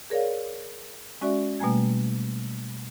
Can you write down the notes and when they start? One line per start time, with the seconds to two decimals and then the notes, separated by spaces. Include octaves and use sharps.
0.10 G#4 A#4 C#5 D5 F5
1.21 G#3 C#4 F#4 D5 E5
1.59 B2 G3 A3 A#3 G#5 G#6